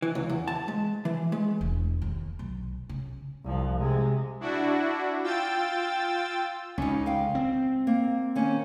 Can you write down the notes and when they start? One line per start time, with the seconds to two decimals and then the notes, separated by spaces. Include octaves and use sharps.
0.02 E3
0.15 C#2
0.29 E2
0.48 A5
0.68 G#3
1.05 E3
1.32 G#3
1.61 E1
2.02 D#2
2.39 B1
2.89 C#3
3.44 C2 F3
3.78 C3 G#3
4.40 D4 E4 F#4
5.23 F4 G5 E6 A6
6.78 C#2 C#4 D#4
7.06 F5 G5
7.35 C4
7.87 A#3
8.35 D#3 A#3 C#4